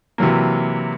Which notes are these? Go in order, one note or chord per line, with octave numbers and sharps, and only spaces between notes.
C3 E3 F#3 A#3